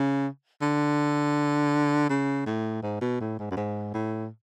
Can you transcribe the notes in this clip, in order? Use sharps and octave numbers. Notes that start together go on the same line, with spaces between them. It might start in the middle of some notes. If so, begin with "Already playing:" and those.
Already playing: C#3
D3
C#3
A2
G#2
B2
A2
G#2
F#2
G#2
A2